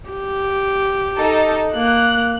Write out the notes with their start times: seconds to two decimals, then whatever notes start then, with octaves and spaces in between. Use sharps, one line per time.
0.10 G4
1.18 D#4 A4
1.75 A#3 F#6